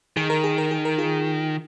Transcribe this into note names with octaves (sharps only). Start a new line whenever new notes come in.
D#3 G#4
A#4
G#4
A#4
G#4
A#4
F4 G#4